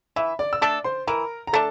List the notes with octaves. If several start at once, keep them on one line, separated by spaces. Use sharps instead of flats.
E3 E5
D5 D6
E6
A3 D4 A4 D5 D6
C5 C6
E3 A#4 A#5
A#5
A3 D4 A4 A5